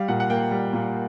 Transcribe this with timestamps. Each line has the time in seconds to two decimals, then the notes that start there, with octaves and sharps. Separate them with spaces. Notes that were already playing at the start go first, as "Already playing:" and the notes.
Already playing: G3 F5
0.08 A#2 F#5
0.20 F#5
0.30 A#3 G5
0.52 G3
0.73 A#2